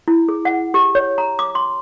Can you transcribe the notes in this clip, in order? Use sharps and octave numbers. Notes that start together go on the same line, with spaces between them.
E4
G#4
F#5
G4
C#5
A#5
D6
C6